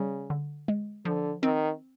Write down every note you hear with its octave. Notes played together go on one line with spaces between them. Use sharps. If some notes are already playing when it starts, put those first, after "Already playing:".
Already playing: C#3 G3
D3
G#3
D3 F3
D#3 C4